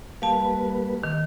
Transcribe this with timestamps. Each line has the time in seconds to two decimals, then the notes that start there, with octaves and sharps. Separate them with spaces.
0.22 G3 A#3 B4 F5 A5
1.03 D#3